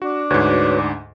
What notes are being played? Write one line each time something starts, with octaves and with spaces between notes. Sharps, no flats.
D4 F#4
D2 G#2 F#4 B4 C#5